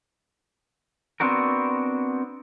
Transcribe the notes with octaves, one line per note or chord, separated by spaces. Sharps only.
B3 C4 D4 F#4 A#4